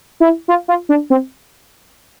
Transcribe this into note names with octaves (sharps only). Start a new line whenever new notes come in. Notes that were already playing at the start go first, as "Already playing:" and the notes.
E4
F4
F4
D4
C4